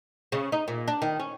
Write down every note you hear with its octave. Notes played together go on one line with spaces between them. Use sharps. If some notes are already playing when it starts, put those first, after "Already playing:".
C#3
D#4
A#2
D4
D#3
C#4